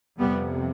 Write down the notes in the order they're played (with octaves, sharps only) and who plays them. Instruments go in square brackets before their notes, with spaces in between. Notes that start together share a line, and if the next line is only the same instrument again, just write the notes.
[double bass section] F2 C3 G3 B3